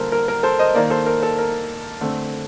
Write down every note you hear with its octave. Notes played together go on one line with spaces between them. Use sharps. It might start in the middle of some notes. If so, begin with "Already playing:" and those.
Already playing: D3 G3 A#3 A4 A#4 C5
A#4
A#4
A4 C5
C5 D#5
D#3 A#3 A#4 D5
A4 C5
A#4
A4
A#4
D3 A3 C4